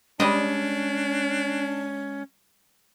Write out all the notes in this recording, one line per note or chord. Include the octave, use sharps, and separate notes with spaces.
G3 G#3 C#4 D4 C5 D#5